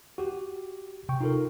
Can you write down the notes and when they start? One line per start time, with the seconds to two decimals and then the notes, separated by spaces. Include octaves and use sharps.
0.18 F#4 G4
1.09 C3 G5 C#6
1.21 D#4 F4 A4 A#4